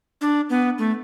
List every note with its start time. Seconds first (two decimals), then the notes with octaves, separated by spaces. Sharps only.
0.21 D4
0.50 B3
0.78 A3